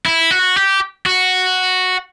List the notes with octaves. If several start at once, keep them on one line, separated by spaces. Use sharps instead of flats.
E4
F#4
G4
F#4